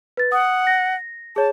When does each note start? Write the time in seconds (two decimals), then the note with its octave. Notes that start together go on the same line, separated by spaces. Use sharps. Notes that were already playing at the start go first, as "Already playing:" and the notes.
0.17 B4 A6
0.32 F#5 D#6
0.67 A#6
1.36 G#4 C#5 A5